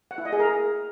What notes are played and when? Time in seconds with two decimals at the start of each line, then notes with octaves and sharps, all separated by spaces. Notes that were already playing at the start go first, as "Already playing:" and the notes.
0.11 F#5
0.18 E4
0.25 D#5
0.32 G#4
0.40 A#4